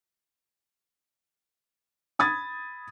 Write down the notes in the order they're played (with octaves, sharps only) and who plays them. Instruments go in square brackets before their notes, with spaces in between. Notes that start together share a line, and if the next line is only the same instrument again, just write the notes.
[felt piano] B5 D#6 G#6 A6